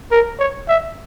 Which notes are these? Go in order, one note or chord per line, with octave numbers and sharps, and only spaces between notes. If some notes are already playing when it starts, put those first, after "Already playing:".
A#4
C#5
E5